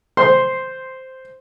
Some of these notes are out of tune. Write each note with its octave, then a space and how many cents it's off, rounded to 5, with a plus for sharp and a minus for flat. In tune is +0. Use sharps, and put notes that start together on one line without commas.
C5 -5 C6 +0